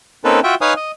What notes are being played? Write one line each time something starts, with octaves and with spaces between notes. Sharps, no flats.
A#3 C4 C#4 D#4 A4 B4
F4 F#4 E5 G5
D#4 B4 C#5 F5 G#5 D#6
D#5